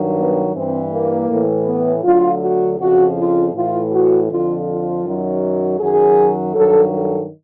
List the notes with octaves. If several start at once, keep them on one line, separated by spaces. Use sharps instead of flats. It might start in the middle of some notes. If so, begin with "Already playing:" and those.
Already playing: G2 D#3 F#3
B3
G2 E3 C4
A#3
A2 E3
B3
D2 D3 F#3 F4
F#4
F2 C#3 F3 F#4
F4
A2 E3 F4
F#4
F2 D3 F3 F4
F4
F#2 D#3 F#3
F#2 D#3 F#3 G#4
G2 D#3 F#3 A4
A4